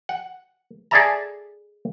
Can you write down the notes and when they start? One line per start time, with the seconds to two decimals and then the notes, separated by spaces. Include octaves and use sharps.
0.09 F#5
0.91 G#4 A4 D5 E5 A5 A#5